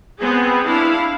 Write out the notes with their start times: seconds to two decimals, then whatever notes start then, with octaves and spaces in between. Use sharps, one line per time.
0.19 B3 C4 G#4
0.66 D4 E4 F5